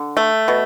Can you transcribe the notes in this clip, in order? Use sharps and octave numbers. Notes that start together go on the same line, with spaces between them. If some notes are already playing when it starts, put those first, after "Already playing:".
Already playing: D3
A3
B2